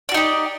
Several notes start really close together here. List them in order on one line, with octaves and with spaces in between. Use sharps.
D5 F#4 D#4 G4